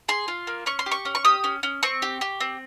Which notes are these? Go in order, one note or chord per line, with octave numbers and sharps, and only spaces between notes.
G#4 C6
F4
A#3
C#4 C#6
C6
G4
C#6
C#4
C#6
G4 D#6
C#4
C#4
C4 C#6
G4
G4
C4